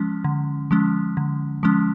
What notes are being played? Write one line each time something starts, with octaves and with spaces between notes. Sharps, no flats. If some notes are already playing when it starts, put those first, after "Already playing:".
Already playing: F3 G#3 C#4
D3
F3 G#3 C#4
D3
F3 G#3 C#4